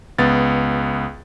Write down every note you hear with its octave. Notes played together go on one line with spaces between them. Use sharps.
C#2 B3 A6